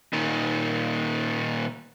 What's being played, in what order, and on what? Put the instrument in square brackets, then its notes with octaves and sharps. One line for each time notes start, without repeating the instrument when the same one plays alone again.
[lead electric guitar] A#2 D#3